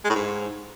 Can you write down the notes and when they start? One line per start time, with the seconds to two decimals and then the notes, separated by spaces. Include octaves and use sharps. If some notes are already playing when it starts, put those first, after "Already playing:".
0.04 G#3
0.10 A2
0.15 G#2